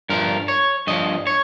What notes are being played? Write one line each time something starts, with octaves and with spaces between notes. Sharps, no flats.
G2 F3 A#4
C#5
G2 F3 D#5
C#5